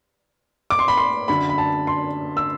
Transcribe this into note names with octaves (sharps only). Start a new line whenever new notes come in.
D6
C6
B5
C6
F#2 D3 B5
B5
A5
C6
E6